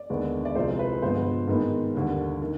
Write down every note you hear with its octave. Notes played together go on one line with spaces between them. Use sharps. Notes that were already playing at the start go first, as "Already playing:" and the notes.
Already playing: D5
D#2 D3 G#3 B3
D5
C2 C3 F3 G#3 C5
B4
G2 D3 F3 G#3 B3 C5
G#2 D#3 G#3 B3
D#2 D3 G3
D#3